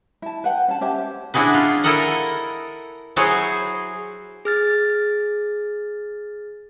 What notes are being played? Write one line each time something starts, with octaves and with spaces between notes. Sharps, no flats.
E4 A5
B4 F#5 G5
C#4 A5
C#4 G4 C5 E5
D4 E4 F#4 G#4 B4
F4
E4 A4 A#4 D#5 F#5
F#3 E4 F#4 G#4 C5 C#5
G#4 F6 A6